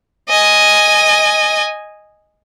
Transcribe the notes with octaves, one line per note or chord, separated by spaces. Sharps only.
D#5 G#5